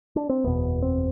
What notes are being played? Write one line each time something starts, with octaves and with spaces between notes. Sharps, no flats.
D4
C4
F#1 E2 B2 B3
C4